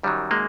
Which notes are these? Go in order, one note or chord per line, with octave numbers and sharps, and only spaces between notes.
F#2 D#3 F#3 G3
G#3 A#3